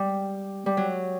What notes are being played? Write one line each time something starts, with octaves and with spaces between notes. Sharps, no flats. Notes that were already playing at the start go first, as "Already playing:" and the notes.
Already playing: G3
G3
F#3